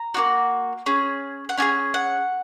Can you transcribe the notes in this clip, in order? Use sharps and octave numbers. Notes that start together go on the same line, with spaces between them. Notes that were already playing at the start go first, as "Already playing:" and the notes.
Already playing: A#5
A#3 D#4 F#4
C#4 G#4
F#5
C#4 F4 G#4 G#5
F#5